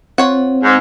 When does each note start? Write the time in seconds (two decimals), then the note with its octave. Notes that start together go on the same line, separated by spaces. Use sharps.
0.18 C4 F4 C#5 F#5
0.64 G#2